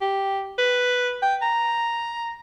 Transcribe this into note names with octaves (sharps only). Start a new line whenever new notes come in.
G4
B4
G5
A#5